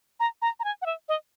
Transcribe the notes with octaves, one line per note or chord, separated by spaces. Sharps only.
A#5
A#5
A#5
G#5
F#5
E5
D#5